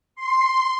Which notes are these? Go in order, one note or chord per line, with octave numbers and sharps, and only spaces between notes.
C6